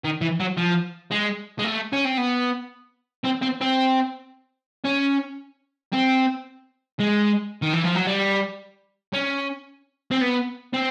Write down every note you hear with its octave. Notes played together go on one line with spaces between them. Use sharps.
D#3
E3
F#3
F3
G#3
G#3
A3
C#4
C4
B3
C4
C4
C4
C#4
C4
G#3
D#3
E3
F3
F#3
G3
C#4
C4
B3
C4